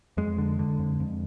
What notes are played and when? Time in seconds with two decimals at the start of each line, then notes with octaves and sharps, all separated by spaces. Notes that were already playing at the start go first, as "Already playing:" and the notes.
0.17 F2 G#3
0.38 D3
0.59 D3
0.79 F2
1.00 F2